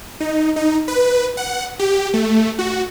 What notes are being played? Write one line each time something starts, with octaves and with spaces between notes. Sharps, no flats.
D#4
D#4
B4
F#5
G4
A3
F#4